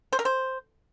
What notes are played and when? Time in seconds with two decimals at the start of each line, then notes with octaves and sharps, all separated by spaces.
0.13 C5
0.19 A#4
0.25 C5